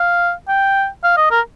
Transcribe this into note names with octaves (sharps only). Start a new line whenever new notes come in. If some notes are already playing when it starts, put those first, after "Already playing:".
Already playing: F5
G5
F5
D#5
A#4